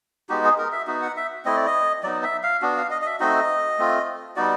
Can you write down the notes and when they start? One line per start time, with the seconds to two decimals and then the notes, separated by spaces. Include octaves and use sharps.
0.29 G#3 B3 D#4 F#4 G4
0.44 G#4
0.58 A#4
0.72 E5
0.87 B3 D#4 F#4
1.02 F#5
1.17 E5
1.45 A3 C4 E4 D#5
1.56 D5
1.67 D#5
2.03 F#3 B3 D#4 D5
2.23 E5
2.43 F5
2.62 B3 D4 F#4
2.77 F5
2.90 D#5
3.02 D#5
3.06 E5
3.20 A3 C4 D#4 F#4 D#5
3.78 A3 C4 F4
4.36 G3 B3 D#4 F#4 D5